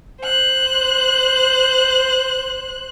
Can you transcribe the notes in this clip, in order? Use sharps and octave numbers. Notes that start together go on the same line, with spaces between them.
C5 F#6